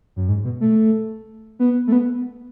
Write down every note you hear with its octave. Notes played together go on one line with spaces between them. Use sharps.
F#2
G#2
B2
A3
B3
A3
B3